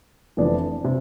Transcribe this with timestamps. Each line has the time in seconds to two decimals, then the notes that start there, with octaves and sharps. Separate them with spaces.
0.37 F1 F2 E3 B3 D4
0.84 C3